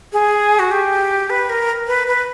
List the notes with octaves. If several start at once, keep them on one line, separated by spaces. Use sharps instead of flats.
G#4
F#4
G4
B4
A#4
B4
B4